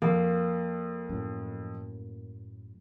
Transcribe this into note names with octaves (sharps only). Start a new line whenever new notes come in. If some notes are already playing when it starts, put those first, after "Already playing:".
F2 A#3
F#2 A2